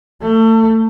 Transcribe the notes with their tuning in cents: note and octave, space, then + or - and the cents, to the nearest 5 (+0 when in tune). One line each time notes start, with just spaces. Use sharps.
A3 +30